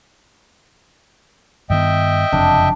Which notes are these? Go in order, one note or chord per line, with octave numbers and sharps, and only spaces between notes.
G2 D#3 B3 D#5 E5 G5
F#1 F2 C3 D4